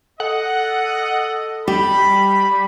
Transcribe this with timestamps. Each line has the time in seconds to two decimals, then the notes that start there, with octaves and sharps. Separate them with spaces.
0.20 A4 D#5 F#5
1.68 G3 G4 B5